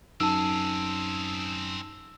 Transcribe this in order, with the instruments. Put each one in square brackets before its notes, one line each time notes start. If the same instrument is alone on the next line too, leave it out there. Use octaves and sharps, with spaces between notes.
[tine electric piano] F#2 [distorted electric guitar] C4 G#4 [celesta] D#4 A5 [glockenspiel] E6